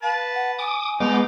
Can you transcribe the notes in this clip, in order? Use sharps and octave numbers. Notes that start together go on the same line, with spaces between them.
B4 F5 A5
F#5
G#5 D6 D#6
F3 G#3 B3 D#4 D6